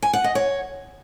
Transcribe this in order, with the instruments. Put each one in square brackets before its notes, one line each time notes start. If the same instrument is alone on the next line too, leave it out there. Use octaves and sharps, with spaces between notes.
[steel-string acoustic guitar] G#5
F#5
D#5
C#5